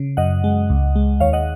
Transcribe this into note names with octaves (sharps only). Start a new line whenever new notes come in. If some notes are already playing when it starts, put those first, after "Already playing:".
Already playing: C#3
F#2 D#5 F#5
G#3
C#2
G#3
D#2 C#5 F5
D#5 F#5